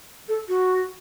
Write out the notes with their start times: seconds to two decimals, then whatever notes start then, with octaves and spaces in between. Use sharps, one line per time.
0.28 A4
0.48 F#4